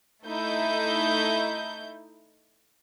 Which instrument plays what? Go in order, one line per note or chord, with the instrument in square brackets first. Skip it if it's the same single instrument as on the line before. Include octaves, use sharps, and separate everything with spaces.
[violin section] A3 D#4 E4 G6